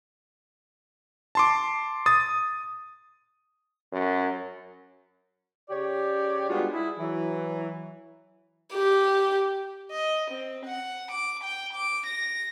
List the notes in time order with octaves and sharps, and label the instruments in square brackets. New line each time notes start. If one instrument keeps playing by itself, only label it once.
[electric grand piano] A5 C6 D6
D#6 A6
[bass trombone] F#2
[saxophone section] C#3 G4 C#5 D5
G3 G#3 B3 D4 F4 F#4
E4 G#4
E3 F#3
[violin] G4
D#5
C4
F#5
D6
G5
D6
A#6